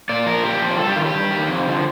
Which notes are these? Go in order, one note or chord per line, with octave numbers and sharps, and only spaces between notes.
A#2 D5
F3 A#4
A#2 G4
F3
G2 A4
G4
D#3 F4
G4
G2
D#3
F2
D3 F3